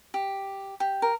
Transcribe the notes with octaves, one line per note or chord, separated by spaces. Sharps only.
G4
G4
A#4